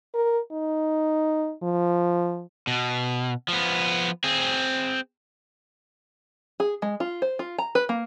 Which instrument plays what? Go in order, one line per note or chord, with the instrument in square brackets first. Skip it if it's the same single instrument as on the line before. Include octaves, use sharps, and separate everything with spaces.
[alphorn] A#4
D#4
F3
[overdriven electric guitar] B2
F3 B3
C4 G#4
[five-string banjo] G#4
G#3
F4
C5
F4
A#5
B4
A#3